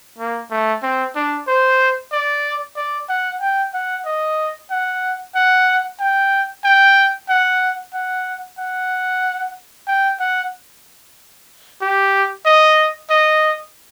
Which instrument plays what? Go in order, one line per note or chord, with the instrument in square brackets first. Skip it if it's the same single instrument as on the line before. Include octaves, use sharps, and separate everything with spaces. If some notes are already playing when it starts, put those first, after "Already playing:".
[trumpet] A#3
A3
C4
D4
C5
D5
D5
F#5
G5
F#5
D#5
F#5
F#5
G5
G5
F#5
F#5
F#5
G5
F#5
G4
D#5
D#5